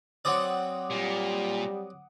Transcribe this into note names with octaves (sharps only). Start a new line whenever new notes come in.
F#3 C4 D5 F#5 D6 D#6
A#2 G3